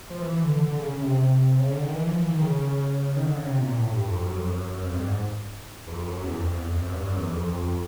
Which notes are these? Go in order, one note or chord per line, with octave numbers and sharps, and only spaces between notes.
F3
E3
E3
D3
D3
D3
C#3
C#3
C3
C#3
D3
D#3
E3
F3
E3
D#3
C#3
D#3
D3
C#3
C3
A#2
A2
G2
F2
F#2
F2
F#2
F2
G2
G#2
E2
F2
F#2
E2
F2
E2
F2
F#2
G2
F#2
E2
F2
F2
F2